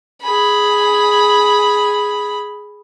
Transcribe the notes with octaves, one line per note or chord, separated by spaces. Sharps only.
G#4 B5